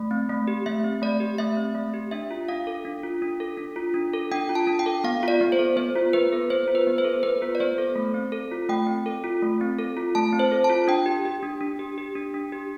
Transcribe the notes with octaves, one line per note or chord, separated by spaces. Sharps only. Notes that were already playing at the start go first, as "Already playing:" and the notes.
Already playing: A3
C4
A3
G4
A3 E5
C4
A3 D5
G4
A3 E5
C4
A3
G4
D4 E5
F4
D4 F5
A4
D4
F4
D4
A4
D4
F4
D4
A4
D4 G5
F4
A5
D4
G5
A4
B3 F5
F4 D5
B3
C5
A4
B3 C5
F4
B3 B4
A4
B3 C5
F4
B4
B3
C5
A4
B3 B4
F4
D5
B3 C5
A4
A3
C4
A4
F4
A3 G5
C4
A4
F4
A3
C4
A4
F4
A3 A5
C4
C5
A4
A5
F4
D4 G5
G4
G4
D4
D4
G4
G4
D4
D4
G4